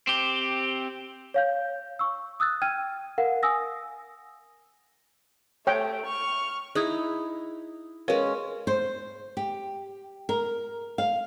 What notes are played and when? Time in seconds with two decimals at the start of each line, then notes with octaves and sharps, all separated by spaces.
0.07 C4 G4
1.34 C#5 F5 G6
1.99 C#6 E6
2.40 D#6 E6 F#6 A6
2.62 G5 F6 G#6 D#7
3.18 A#4 F5 F#5
3.43 G#5 D#6 E6 A#6
5.67 A3 C#5 G5
6.06 C#6 F6
6.75 D#4 E4 G#4 D#6 G#6
8.08 G#3 C#4 A#4 B4 F5
8.67 C5
9.37 G4
10.29 A#4
10.98 F5